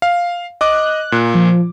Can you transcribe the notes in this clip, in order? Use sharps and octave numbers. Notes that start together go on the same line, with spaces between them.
F5
D#5 D6 F#6
A#2
F3